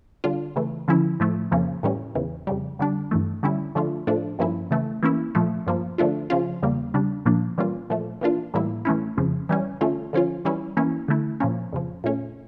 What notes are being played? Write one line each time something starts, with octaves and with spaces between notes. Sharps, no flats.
D3 G3 D4 F4
C#3 E3 A3
D3 F3 C#4 E4
A2 F3 A3
F2 C#3 F3 A#3 C#4
A2 E3 G3 C#4
E2 C#3 E3
F2 C#3 G3
D3 G3 D4
G2 E3 A3
D3 G3 C#4 E4
D3 F3 A3 D4 F4
A2 F3 A3 D4
G2 F3 A#3 C#4 E4
C#3 E3 A3
E3 A#3 C#4 E4
A#2 F3 A3
G2 F3 A#3
D3 F3 A3 D4 F4
C#3 F3 C#4 F4
E2 C#3 G3 A#3
C#3 G3 D4
A#2 F3 A#3 D4
E3 G3 A#3 C#4 F4
A#2 F3 A3
E3 A#3 D4 F4
A2 E3 G3 A#3 E4
E3 A3 C#4 E4
F2 C#3 F3
E3 G3 C#4
D3 A3 C#4 F4
D3 F3 C#4 F4
E3 G3 C#4 E4
E3 A#3 C#4 E4
D3 A3 E4
A#2 F3 A#3 C#4
F2 C#3 F3
A#2 A3 C#4